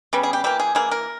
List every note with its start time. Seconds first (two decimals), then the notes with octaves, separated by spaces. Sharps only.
0.13 C#3 G3 B3
0.23 G#4
0.33 G4
0.44 E3 A#3 G4
0.60 G#4
0.75 E3 A#3 G#4
0.91 A#4